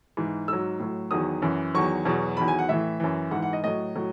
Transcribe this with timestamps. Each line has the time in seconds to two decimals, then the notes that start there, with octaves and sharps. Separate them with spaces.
0.17 G#2 E3
0.48 G#2 F#3 E6
0.79 A2 F#3
1.11 E2 D#3 F#3 D#6
1.42 F#2 E3
1.74 E2 D#3 F#3 C#6
2.05 E2 B2 F#3
2.37 E2 D#3 F#3 B5
2.48 G#5
2.59 F#5
2.69 A2 E3 E5
3.00 F#2 E3
3.31 G#2 F#5
3.36 E3
3.42 F#5
3.53 D#5
3.64 A2 F#3 D#5
3.96 A2 F#3